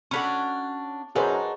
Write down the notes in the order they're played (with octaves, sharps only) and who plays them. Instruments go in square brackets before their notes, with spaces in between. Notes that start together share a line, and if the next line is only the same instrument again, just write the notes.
[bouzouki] C#4 D4 F#4 [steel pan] A4 B5 C#6
[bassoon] F#2 [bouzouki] D4 D#4 F#4 [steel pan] G#4 B4 C5